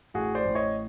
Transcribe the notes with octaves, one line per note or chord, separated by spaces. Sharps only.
A1 F#4 G#4
C5 D5
A1
C#5 D#5